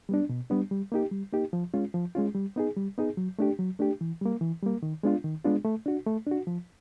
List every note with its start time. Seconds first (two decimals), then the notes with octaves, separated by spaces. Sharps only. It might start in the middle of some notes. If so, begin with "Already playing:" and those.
0.09 G3 B3 D4
0.29 B2
0.50 G3 B3 D4
0.71 G3
0.92 A#3 D#4 G4
1.12 G3
1.33 A#3 D#4 G4
1.53 F3
1.74 G#3 C#4 F4
1.94 F3
2.15 G#3 C#4 F4
2.35 G3
2.56 B3 D#4 G#4
2.77 G3
2.98 B3 D#4 G#4
3.17 F#3
3.39 A3 D4 G4
3.59 F#3
3.79 A3 D4 G4
4.01 E3
4.21 G3 A#3
4.41 E3
4.63 G3 A#3
4.83 D#3
5.03 G#3 B3 D4 F4
5.24 D#3
5.45 G#3 B3 D4 F4
5.64 A3
5.86 D4 F#4
6.07 A3
6.27 D4 F#4
6.47 F3